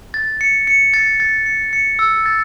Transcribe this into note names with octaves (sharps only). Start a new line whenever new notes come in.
A6
C#7
C#7
A6
A6
C#7
C#7
E6
A6